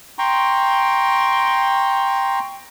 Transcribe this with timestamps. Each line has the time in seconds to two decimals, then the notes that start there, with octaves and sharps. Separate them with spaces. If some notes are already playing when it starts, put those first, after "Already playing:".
0.19 G5 A#5 C6 C#6